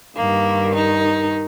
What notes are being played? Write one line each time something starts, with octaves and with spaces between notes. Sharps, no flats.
G2 D#3 A#3
D#4